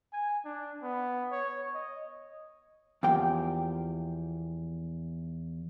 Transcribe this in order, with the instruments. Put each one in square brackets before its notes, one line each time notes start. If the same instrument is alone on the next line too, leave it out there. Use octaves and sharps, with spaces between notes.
[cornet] G#5
D4
B3
C#5
D#5
[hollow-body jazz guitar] E2 F3 A#3 G4 G5